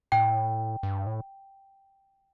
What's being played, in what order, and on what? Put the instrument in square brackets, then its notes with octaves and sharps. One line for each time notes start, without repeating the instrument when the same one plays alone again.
[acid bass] A2 [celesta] G5
[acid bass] G2
A2